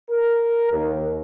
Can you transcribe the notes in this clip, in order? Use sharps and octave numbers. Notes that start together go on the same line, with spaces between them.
A#4
D#2